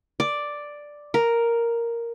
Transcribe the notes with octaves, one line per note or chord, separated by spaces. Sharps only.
D5
A#4